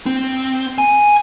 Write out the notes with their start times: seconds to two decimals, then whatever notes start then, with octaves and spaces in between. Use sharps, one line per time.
0.06 C4
0.78 G#5